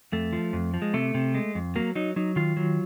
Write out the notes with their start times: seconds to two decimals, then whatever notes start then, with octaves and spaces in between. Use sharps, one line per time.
0.12 F2 A3
0.33 F3
0.53 F2
0.74 F3
0.82 G#3
0.94 C3 A3
1.14 C3
1.34 G#3
1.55 F2
1.76 F#3 A#3
1.96 F#3 D#4
2.16 F#3 D#4
2.36 D#3 F4
2.57 F#3